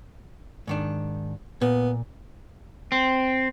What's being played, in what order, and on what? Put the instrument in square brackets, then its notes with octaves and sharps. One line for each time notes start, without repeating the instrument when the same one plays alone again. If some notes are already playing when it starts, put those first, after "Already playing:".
[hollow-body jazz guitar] G#2 D#3 D4
[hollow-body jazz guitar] A#2 [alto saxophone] B3
[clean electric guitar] C4